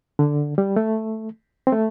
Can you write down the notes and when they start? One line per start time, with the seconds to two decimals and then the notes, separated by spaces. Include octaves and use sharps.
0.19 D3
0.58 G3
0.76 A3
1.67 C4
1.72 A3